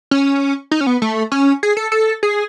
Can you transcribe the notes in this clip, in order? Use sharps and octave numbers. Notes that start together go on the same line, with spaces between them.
C#4
D#4
C#4
B3
A3
C#4
G#4
A4
A4
G#4